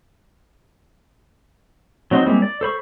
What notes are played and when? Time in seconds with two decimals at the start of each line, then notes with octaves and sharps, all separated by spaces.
2.11 F#3 C4 D#4 F#4 C6
2.26 G3 G#3 A#3 C4 E4
2.42 D5
2.61 A4 C5 B5 C#6